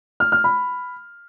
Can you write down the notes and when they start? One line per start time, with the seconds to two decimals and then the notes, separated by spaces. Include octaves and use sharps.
0.20 F6
0.32 F6
0.44 B5